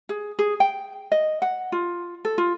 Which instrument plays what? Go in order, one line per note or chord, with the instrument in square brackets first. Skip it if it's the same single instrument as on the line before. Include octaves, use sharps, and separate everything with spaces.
[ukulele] G#4
G#4
G5
D#5
F#5
F4
A4
F4